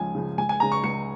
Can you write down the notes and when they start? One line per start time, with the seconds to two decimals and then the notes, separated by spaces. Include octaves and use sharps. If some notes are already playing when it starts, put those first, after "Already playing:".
Already playing: C#2 C#3 F3 G#5
0.15 C#3 F3
0.38 C#2 G#5
0.49 G#5
0.60 C#3 G#3 A#5
0.72 C#6
0.84 C#2 C#7